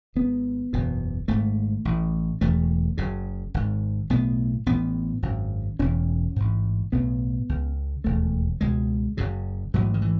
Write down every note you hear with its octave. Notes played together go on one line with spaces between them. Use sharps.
G#1 G#2 B3
F#1 E2 B2
G#1 G#2 A3
A1 A2
E1 E2 C#3 A3
F#1 F#2 C#3
G#1 G#2
B1 A2 B3
A1 A2 B3
G#1 F#2 C#3
E1 E2 C#3 C#4
A1 G#2
B1 A2 B3
C#2 C#3
E1 D#2 C#3 A3
C#2 B2 G#3
F#1 F#2 C#3
A1 G#2 F#3
D#3
E3